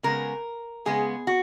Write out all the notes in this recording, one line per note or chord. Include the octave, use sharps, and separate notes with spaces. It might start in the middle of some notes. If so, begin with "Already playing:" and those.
C#3 G#3 B3 A#4
C#3 G#3 B3 G#4
F#4